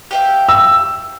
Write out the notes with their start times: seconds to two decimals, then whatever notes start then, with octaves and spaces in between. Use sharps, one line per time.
0.11 G4 E5 F5
0.49 E6